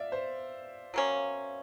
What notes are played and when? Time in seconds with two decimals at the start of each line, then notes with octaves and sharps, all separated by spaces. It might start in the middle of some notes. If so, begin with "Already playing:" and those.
Already playing: D5 E5 F5
0.12 C5
0.94 F#3 A#3 C#4